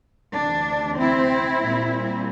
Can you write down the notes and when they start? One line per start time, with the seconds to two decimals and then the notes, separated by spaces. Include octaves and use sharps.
0.33 D2 C3 E3 D4
0.97 C4 E4
1.60 A#2 G3 C4